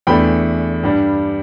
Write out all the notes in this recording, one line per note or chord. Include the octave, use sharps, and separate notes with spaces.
E2 E3 A3 D4 G5 B5
G2 G3 D4